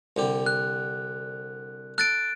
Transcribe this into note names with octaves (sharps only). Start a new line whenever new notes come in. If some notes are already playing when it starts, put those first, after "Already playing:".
C2 D3 G4
F#6
A4 F#6 A6 D7